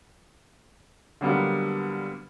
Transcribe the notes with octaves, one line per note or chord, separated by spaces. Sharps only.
D3 F#3 G3 A#3 B3